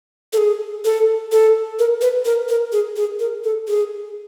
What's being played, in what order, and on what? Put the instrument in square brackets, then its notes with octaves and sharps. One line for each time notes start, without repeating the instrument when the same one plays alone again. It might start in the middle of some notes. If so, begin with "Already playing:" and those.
[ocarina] A4
G#4
A4
A4
A#4
B4
A#4
A#4
G#4
G#4
A#4
A4
G#4